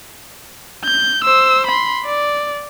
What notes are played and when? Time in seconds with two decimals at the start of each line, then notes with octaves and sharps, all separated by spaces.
0.85 G6
1.24 C5 E6
1.67 B5 C6
2.05 D5